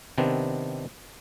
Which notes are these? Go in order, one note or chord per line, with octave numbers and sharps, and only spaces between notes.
C3 D#3 B3 C4 D4